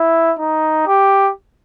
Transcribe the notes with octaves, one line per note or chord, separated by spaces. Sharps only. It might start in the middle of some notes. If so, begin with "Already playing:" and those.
Already playing: E4
D#4
G4